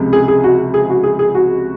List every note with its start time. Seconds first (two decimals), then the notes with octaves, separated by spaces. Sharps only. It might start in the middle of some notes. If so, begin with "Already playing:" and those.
Already playing: C#2 C3 F3 G#3
0.13 G#4
0.28 G#4
0.44 F#4
0.74 G#4
0.89 F#4
1.03 G#4
1.19 G#4
1.34 F#4